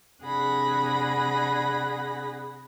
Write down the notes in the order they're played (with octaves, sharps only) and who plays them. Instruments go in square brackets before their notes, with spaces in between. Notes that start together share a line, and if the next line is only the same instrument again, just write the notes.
[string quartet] C3 D4 G#4 F#5 B5 A#6